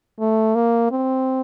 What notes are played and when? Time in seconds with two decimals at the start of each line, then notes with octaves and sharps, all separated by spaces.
0.20 A3
0.55 A#3
0.91 C4